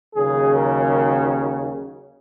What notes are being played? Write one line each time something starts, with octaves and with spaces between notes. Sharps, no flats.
D#2 C#3 F#3 G#4
A#4